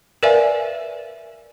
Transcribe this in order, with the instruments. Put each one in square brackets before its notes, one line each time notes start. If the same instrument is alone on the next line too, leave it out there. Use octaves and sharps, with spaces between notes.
[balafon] A#4 B4 D5 E5 F5 G#5